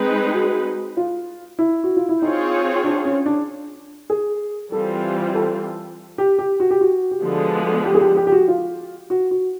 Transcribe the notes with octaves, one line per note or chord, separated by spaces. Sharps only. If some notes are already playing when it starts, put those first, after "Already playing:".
Already playing: G#3 C4 D#4 G#4 B4
F#4
F4
E4
F#4
F4
E4
C4 D#4 F4 G#4 C#5
D4
C#4
D4
G#4
E3 G3 C4 F4 A4
A4
G4
G4
F#4
G4
F#4
G4
D3 F3 G#3 B3 F#4
G4
G#4
G4
G4
G4
F#4
F4
F#4
F#4